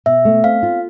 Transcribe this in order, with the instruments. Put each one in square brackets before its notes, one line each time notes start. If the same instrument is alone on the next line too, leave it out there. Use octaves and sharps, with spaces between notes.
[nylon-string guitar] B2 [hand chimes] E5
[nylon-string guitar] A3
[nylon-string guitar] C4 [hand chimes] F5
[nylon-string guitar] F4